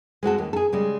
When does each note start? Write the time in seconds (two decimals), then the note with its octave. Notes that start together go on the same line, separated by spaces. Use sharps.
0.23 G#3 C4 F#4 A4
0.38 D#2
0.53 G#4 A4
0.73 C#3 G3 G#3